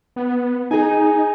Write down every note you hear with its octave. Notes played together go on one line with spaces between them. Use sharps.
B3
D#4 G#4 G#5